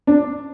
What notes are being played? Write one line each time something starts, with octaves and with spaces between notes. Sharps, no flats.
D4